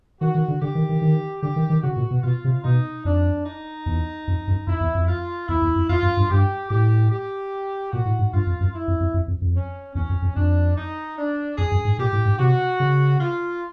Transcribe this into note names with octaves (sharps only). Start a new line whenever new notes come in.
D#3 F#4
D#3
D3
D3 G4
D#3
D#3
D#3
D3 G4
D#3
D#3
C#3 F#4
A#2
B2
B2 F4
C3
B2 D#4
F2 D4
D#4
E2
F2
F#2
F2 E4
E2
F2
F4
E2 E4
E2
F2
F2 F4
F#2
G2
G2 G4
A2 G4
G4
A#2 F#4
A2
G#2
G2 F4
F2
F#2
E4
F2
F2
F2
F2
F2
C#4
E2 C#4
F2
F2
F2 D4
D#4
D4
F2 G#4
F#2
G#2
A#2 G4
A2
G#2
C3 F#4
C#3
F4